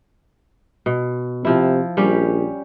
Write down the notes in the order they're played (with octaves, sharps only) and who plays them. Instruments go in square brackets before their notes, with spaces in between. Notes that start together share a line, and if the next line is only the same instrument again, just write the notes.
[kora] B2
[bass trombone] C3 [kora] F3 E4
[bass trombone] A#1 [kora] G3 C#4 G4